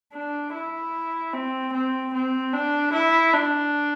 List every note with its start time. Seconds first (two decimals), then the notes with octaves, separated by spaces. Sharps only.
0.14 D4
0.54 E4
1.34 C4
1.73 C4
2.14 C4
2.54 D4
2.93 E4
3.33 D4